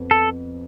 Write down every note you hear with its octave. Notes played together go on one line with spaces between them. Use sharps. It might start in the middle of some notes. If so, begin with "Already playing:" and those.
Already playing: F2 B3
A4